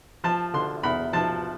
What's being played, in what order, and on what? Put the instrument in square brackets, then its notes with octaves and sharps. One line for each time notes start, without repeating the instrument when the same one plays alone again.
[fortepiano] F3 A5
D3 C6
E2 B5
F3 A5